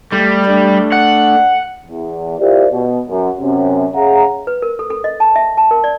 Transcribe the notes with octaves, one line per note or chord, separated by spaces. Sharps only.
G3 A3
A3 D4
F#5
E2
E4 F4 G4 A#4 C5 D5
B2
F#2
F#2 C3 C#4
C#3 G#4 E5 F#5 A#5
B4
A#4
A4
A4
D#5
A5
E5
A5
A#4
D5